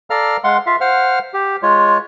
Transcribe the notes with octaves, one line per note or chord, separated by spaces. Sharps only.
A4 D5 F5 A#5 F6
G#3 F5 F#5 C6
F4 E5 F5
C5 F5 F#5 F6
G4
G#3 F4 C#5